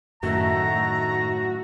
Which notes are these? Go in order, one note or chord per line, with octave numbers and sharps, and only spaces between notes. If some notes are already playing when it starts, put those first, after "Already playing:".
F#2 A2 D#3 A3 F#4 A#5